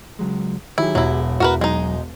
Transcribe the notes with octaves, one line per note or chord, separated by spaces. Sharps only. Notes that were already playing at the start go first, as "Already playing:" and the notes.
C#2 F#3 G#3
D#3 F#3 E4 G4 G#4
E1 F#3 E4
E1 E4 F#4 A#4 B4
F#3 G#3 D#4